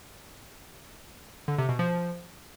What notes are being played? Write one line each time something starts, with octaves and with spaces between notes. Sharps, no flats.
D3
C3
B2
F3